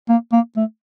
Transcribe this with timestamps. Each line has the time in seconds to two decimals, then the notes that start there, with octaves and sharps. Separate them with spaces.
0.09 A#3
0.32 A#3
0.56 A3